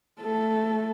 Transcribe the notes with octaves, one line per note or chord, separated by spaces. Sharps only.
A3 A4